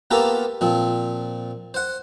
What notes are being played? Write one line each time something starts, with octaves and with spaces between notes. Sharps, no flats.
A#3 B3 F4 G4 A4 A#4
A#2 F3 C4
C5 F#5